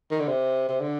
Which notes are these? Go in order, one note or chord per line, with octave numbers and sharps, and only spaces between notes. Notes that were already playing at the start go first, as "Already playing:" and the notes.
D#3
D3
C3
C3
D3